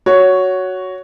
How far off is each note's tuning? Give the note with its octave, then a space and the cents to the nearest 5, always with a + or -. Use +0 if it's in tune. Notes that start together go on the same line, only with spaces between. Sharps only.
F#4 +0 C#5 +10